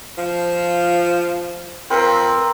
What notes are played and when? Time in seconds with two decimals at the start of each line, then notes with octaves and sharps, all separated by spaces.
0.17 F3
1.90 F2 C4 A#4 B4